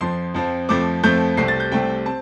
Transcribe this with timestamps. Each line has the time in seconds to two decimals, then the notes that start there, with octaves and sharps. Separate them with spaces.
0.01 F2 F3 C4 C6
0.34 F2 F3 C4
0.69 F2 F3 A3 C4 D6
1.03 F2 F3 A3 C4 G6
1.37 C2 C3 A3 C4 C7
1.48 A6
1.60 G6
1.71 C2 C3 A3 C4 G5
2.06 C4 A5